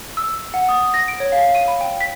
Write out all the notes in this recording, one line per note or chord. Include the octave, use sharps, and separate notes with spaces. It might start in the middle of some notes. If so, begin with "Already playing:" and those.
E6
F#5
D#6
A#6
D7
C#5
F5
D#7
B5
G5
B6